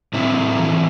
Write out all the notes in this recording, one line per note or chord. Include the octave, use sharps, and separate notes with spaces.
A2 C4 E4
A2
E3